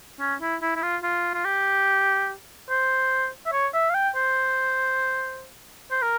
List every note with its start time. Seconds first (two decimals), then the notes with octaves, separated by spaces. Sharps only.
0.20 C#4
0.41 E4
0.62 E4
0.76 E4
0.83 F4
1.03 F4
1.34 F4
1.45 G4
2.70 C5
3.46 E5
3.53 C#5
3.74 E5
3.90 F5
3.95 G5
4.15 C5
5.91 C5
6.02 A#4